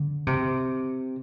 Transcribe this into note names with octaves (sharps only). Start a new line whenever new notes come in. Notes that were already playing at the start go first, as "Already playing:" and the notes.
Already playing: D3
C3